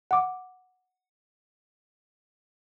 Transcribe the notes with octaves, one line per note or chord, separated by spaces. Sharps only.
F#5 D6